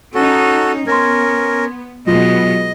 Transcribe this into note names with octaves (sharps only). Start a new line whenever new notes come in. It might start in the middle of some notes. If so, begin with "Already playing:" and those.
C#4 D#4 F#4 A4
B3 C#4 A#4 C6 G#6
B2 F#3 G#3 B3 F4 D#5